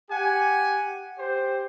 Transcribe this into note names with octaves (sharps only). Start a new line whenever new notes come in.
G4 F#5 G#5
G4 C5